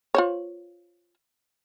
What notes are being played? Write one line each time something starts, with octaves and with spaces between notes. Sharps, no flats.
F4 C5 C#5